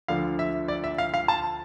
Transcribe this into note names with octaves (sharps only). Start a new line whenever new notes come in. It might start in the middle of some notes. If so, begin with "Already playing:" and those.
D2 D3 F3 F5
E5
D5
E5
F5
F5
A5